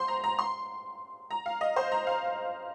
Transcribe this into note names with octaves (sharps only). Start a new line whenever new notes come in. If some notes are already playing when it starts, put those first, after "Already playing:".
Already playing: C5 C6
A#5
A#5
C6
A#5
F5
D#5
C5
A#5
F5